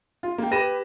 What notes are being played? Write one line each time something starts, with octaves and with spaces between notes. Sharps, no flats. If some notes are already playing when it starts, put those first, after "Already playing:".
F4
A#3 G5
G4 B4 B5 A#6 D#7 E7